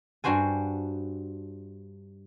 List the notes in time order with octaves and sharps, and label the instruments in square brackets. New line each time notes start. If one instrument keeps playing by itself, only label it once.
[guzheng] G2 D4 F#4 C5 G#5